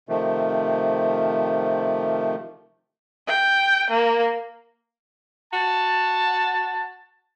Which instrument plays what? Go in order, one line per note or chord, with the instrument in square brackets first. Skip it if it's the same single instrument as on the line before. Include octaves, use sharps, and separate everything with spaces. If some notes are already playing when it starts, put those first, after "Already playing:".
[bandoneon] C3 D#3 F3 A3
[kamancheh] G5
A#3
[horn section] F#4 A5